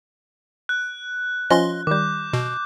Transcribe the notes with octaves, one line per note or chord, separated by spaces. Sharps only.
F#6
F3 C#4 F4 D#5 C6
D#3 G3 D6 G6
B2